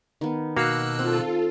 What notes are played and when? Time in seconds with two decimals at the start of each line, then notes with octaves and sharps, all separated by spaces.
0.21 D#3 B3
0.57 B2 A#3 F#4 F5 E6 F#6
0.99 C4 F4 A4